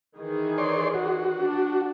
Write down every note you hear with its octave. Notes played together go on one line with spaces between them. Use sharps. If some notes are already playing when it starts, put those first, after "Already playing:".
D#3 E3 G#4
C#5 D5 C6
F#4
D4